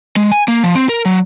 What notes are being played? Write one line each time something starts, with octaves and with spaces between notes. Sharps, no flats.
G#3
G#5
A#3
F3
C4
A#4
F#3